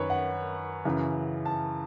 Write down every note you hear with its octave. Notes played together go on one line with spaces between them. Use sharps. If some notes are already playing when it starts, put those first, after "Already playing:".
Already playing: F#2 D#3 B4 C#5
F#5
F#2 C#3 E3
A5